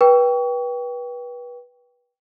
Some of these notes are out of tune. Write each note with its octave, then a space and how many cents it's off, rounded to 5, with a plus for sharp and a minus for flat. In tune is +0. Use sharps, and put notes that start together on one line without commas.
B4 -25 G5 +0 C#6 +35